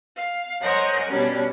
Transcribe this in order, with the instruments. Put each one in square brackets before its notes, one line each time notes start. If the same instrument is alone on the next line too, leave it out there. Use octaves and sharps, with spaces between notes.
[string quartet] F5
A#4 C5 C#5 D#5 F#5 G#5
B2 G3 C#4 D4